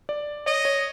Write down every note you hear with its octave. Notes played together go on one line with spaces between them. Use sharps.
D5
C#5 D#5
C#5